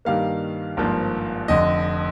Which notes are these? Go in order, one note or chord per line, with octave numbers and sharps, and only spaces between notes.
G2 D#3 G3 A#3 F5
G#1 G2 F3 A#3
F1 F2 D3 D#5